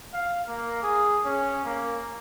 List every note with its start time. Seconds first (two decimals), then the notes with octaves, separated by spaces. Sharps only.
0.14 F5
0.48 A#3
0.83 G#4
1.25 C#4
1.65 A#3